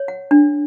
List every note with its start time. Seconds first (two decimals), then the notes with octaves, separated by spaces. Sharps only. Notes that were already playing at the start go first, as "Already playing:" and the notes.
Already playing: C#5
0.08 F#5
0.31 D4